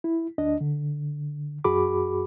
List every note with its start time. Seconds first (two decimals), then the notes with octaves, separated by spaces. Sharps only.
0.04 E4
0.38 D2 D4 D#5
0.61 D3
1.64 F#2 F#4 G#4 B5 D6